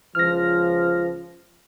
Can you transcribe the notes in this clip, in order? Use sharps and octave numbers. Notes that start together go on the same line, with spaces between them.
C#2 F3 F6 A#6